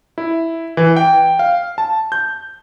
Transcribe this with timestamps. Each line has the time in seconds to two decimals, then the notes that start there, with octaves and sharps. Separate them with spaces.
0.18 E4
0.77 E3
0.96 G5
1.39 F5
1.78 A5
2.12 G6